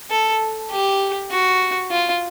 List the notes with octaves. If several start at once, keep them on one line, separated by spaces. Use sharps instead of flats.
A4
G4
F#4
F4